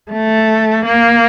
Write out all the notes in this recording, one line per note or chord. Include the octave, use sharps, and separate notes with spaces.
A3
A#3